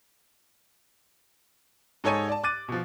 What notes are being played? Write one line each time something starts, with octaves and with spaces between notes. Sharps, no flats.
G#2 D#4 A4 C#5 G#5 D#7
D5 A5
D6 F#6 A6 D#7
B2 F3